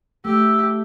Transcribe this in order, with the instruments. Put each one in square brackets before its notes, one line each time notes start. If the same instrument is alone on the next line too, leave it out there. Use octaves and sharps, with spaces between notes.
[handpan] A3 [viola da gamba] G4 [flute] E6